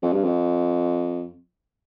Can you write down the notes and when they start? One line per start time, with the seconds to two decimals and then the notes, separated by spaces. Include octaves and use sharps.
0.02 F2
0.13 G2
0.24 F2